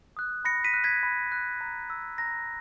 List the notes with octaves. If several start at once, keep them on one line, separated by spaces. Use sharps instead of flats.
D#6 F#6
B5 A#6 C#7
B6 D#7
F#6
G#6 B6
B5
F#6
A#5
E6
A#5 A#6